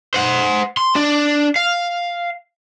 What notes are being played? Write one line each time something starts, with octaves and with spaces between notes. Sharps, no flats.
C5 F#5
C6
D4 D5
F5